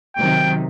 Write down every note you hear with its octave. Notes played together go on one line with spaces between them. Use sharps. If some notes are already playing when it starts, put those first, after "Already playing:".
C3 D#3 F#3 G5